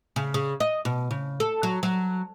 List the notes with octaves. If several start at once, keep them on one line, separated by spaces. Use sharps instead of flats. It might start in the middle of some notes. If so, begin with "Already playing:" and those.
C#3
C#3
D#5
B2
C#3
A4
F#3
F#3